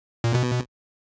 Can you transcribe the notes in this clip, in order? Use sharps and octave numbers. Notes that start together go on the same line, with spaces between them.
A#2
B2